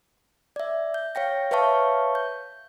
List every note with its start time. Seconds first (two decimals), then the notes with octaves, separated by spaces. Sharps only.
0.56 D5 E5
0.94 G6
1.15 C#5 F5 G5 A#6
1.51 B4 C#5 E5 F5 A5 C#6
2.15 G6